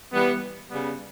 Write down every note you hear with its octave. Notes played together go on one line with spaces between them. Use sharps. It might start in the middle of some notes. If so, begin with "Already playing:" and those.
E3 G3 B3
C#3 G3 B3